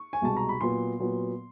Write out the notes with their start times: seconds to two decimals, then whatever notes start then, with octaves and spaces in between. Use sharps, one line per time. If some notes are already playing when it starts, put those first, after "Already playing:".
Already playing: C#6
0.13 G#5
0.21 C2 B2 G#3 A5
0.37 A#5
0.49 B5
0.61 A#2 F#3 B3 C6
0.99 A#2 F#3 B3